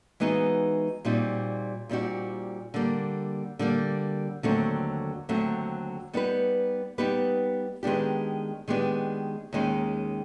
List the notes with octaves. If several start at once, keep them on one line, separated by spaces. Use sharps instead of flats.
E3 G#3 B3 D#4 F#4
A#2 G3 C4 D#4 F#4
A#2 G3 C4 D#4 F#4
D3 G3 A#3
D3 G3 A#3
D#2 D3 F#3 A3 C4
D#2 D3 F#3 A3 C4
G3 B3 D#4 G4 B4
G3 B3 D#4 G4 B4
D#3 G#3 B3 D4 G4
D#3 G#3 B3 D4 G4
D#2 D#3 G#3 C#4